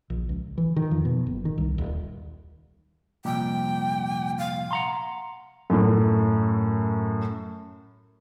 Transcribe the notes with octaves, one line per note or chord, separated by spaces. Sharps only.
A#1
C#2
E3
D#3
F2
B2
F#1
D#3
C2
D#1
C2 F2 A#2 G5
F5
F#5 A#5 C6
F#2 A2